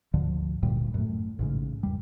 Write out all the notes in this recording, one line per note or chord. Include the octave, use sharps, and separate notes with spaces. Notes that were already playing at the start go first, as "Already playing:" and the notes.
D2 G#2 D3 F3
F#1 D2 A#2 G3
F#2 A2
A1 G#2 C#3
E2 G3